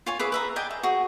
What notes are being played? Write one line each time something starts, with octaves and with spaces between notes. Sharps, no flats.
F4 C#5 G#5
G#4 B4 E5 D6
B4 E5 A#5
D5 D#5 G5 G#5
E5
F#4 G#4